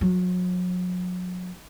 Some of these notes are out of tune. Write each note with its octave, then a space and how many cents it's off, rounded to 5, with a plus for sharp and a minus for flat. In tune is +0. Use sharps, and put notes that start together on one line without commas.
F#3 -35